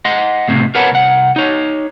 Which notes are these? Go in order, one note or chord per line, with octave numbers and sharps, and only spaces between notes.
D#5 F#5 C6
C#2 A2 C3
A#4 B4 C#5 F#5 A5 B5
C2 F#5
D#4 C#5